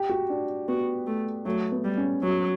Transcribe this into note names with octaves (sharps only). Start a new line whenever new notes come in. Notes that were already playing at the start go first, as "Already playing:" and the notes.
Already playing: G4
F#4
D4
B3 F#4
A3
F#3 A3
B3
G3
C#4
F#3 C#4